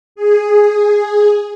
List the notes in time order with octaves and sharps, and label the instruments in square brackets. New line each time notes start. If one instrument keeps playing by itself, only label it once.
[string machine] G#4